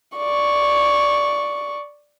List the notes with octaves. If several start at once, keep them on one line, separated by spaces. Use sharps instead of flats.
D5 C#6